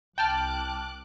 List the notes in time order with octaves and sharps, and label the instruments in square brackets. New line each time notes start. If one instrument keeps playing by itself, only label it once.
[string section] C2 D6 F#6 [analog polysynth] G5 A5 F6